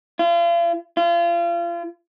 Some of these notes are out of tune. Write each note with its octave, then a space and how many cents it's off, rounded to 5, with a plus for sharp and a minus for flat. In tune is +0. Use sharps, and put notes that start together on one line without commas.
F4 -40
F4 -35